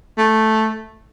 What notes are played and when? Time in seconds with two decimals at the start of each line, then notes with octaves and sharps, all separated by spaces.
0.18 A3